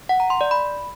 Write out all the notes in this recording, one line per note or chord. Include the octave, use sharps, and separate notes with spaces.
F#5
A#5
C6
D5
B5